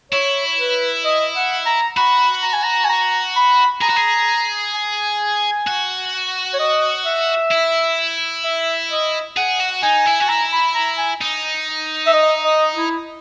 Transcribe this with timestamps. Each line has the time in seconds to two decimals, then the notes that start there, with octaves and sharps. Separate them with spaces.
0.12 E4 C#5
0.59 B4
1.05 D#5
1.36 F#5
1.66 A#5
1.97 F#4 B5
2.43 A#5
2.53 G#5
2.63 A#5
2.84 G#5
2.89 A#5
3.36 B5
3.81 G#4 A#5
3.90 F#4
3.96 G#4
4.74 G#5
5.67 F#4
6.54 C#5
6.59 D#5
7.05 E5
7.52 E4
8.44 E5
8.90 D#5
9.37 G#4 F#5
9.60 F#4
9.83 D#4 G#5
10.06 E4
10.20 F#4 G#5
10.29 E4 A#5
10.52 B5
10.75 A#5
10.98 G#5
11.21 D#4
12.07 E5
12.13 D#5
12.44 D#5
12.75 E4